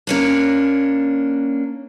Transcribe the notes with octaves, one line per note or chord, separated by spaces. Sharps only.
A#3 C#4 D4